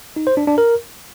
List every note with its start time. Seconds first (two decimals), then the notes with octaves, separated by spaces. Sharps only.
0.16 D#4
0.27 C5
0.37 D4
0.47 D4
0.58 A#4